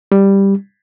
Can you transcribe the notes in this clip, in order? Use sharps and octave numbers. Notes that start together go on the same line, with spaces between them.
G3